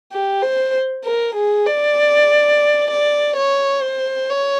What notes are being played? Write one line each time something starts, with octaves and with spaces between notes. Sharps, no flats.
G4
C5
A#4
G#4
D5
D5
C#5
C5
C#5